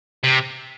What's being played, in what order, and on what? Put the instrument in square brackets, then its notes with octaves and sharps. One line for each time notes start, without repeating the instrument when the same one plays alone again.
[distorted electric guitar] C3